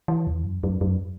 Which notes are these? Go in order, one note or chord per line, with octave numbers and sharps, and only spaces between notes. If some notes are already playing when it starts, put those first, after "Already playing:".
E3
E2
F#2
F#2
F#2